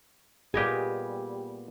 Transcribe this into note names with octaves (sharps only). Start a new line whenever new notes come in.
A#2 G3 B3 G4 G#4 D#5 G#5